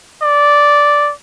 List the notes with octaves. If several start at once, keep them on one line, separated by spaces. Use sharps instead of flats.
D5